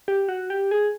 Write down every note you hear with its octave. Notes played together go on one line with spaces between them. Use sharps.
G4
F#4
G4
G#4